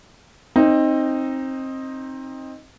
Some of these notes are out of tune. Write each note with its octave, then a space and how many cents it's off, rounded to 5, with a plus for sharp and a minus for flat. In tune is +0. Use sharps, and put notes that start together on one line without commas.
C4 +20 D#4 +0